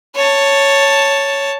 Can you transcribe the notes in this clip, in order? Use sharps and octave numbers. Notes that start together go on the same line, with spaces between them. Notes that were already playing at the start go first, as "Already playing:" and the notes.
C#5 A5